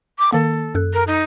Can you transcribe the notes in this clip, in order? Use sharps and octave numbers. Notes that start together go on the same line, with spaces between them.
D6
D#3 A#3 A4
F#2 A4 F#6
A#4
D#4